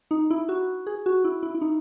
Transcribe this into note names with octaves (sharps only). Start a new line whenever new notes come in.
D#4
E4
F#4
G#4
F#4
E4
E4
E4
D#4